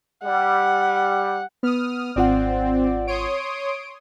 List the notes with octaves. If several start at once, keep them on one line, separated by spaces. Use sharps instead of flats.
G3 F#5
B3 D#6 F6
G#1 C4 F4 D5 F#5
C#5 C6 D#6 D7